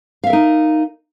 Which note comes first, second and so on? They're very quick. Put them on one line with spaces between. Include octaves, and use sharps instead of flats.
F5 E5 A#4 D#4